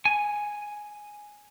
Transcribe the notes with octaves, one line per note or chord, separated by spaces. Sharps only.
G#5